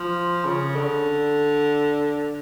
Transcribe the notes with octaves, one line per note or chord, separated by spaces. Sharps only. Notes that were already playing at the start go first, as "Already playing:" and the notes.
Already playing: F3
C#3
D3